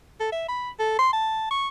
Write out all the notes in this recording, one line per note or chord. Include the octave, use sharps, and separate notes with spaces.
A4
E5
B5
A4
C6
A5
C#6